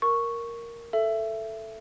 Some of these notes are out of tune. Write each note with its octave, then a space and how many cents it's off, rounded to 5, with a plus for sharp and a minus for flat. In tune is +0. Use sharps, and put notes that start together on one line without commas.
A#4 +0 C#6 +0
A4 +0 E5 +15